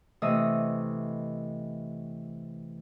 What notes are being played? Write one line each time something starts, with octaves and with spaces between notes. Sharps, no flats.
C3 E3 A3 D#5 D#6 E6